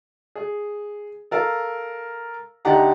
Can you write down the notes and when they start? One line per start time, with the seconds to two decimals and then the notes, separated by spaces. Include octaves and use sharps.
0.35 G#4
1.31 A4 A#4 F5
2.65 D2 D4 D#4 G4 F#5 A#5